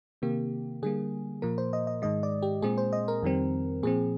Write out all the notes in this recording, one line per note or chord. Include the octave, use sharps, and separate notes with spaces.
C3 D#3 A#3 G4
D3 G3 A#3 G#4
A#2 F3 A#3 A#4
C5
D#5
D#5
G#2 D#3 G#3 D#5
D5
G4
A#2 G#3 C4 G#4
C5
D#5
A#4
F2 D#3 G3 C4
A#2 F3 C4 G#4